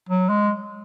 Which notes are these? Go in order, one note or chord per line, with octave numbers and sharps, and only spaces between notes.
F#3
G#3